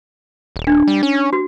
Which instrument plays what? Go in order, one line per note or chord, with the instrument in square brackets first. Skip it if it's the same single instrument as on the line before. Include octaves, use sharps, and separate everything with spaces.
[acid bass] D#1
[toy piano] D4
[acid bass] G3
C#4
[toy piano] F#4